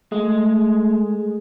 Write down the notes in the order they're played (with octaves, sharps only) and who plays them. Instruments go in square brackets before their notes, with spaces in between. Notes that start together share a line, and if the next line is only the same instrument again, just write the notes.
[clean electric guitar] G#3 [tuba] A3